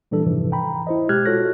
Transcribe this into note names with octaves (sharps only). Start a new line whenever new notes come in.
A#2 E3 G3 D4 A4
F2 G#2 C3 E3 F3
G5 A#5 B5
E4 C5 D#5
B2 G#3 G4 F6 F#6 G#6
F4 F#4 A4 C#5 F#6 A#6